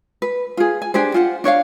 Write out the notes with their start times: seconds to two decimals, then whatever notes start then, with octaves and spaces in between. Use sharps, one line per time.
0.22 B4
0.57 F4 G#4
0.82 G#5
0.94 D4 G4 G#4 C5
1.14 F4 C5 F#5
1.44 D4 C#5 E5 F5